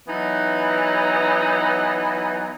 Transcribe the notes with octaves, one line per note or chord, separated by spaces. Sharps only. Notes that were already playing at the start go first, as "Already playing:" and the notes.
E3 F#3 B3 D#4